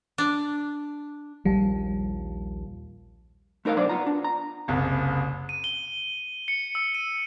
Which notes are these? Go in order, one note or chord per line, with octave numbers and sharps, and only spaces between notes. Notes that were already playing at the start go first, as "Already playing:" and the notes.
D4
A#1 D#2 F3 G3
A3 D#4 A#4 C#5 F5
B2 F#3 D4 C5 D5
B3 F4 A#5
D4
A#5
F#1 C2
D#7
G7
C#7
E6
D#7